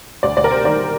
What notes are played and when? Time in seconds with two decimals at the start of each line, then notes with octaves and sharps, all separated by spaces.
0.23 D2 D5
0.37 D2 D5
0.44 A#4
0.50 C3 C5
0.64 D#3 D5
0.78 D#3